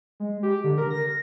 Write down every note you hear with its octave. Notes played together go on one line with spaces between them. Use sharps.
G#3
G4
D3
A#4
A#6